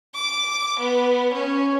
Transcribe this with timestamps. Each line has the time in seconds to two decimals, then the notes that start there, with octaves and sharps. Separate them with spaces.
0.15 D6
0.79 B3
1.33 C#4